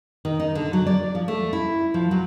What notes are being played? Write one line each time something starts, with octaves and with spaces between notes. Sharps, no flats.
D#3
D#4
D3
F#3
D5
F3
A3
E4
F3
F#3